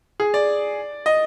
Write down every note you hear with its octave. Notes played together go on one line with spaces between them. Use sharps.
G#4
D5
D#5